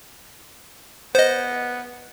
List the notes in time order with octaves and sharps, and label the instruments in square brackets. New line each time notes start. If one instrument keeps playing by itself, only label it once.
[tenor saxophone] B3 [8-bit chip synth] C5 D#5